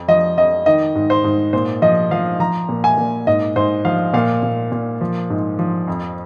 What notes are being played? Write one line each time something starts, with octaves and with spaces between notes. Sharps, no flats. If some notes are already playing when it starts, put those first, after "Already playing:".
Already playing: F2
F3 D#5
F2 D#5
D#3 D#5
G#2
C5
G#2
A#2 C5
F3 D#5
F3 F5
F3 A#5
A#2
G#5
A#2
G#2 D#5
G#2 C5
F3 F5
A#2 F5
A#2
A#2
F3
G#2
F3
F2